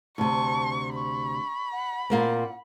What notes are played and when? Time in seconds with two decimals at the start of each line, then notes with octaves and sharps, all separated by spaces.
0.18 D2 C3 A5 C#6
0.95 B5 C#6
1.71 F#5
2.10 A#2 A#3 C4 F#5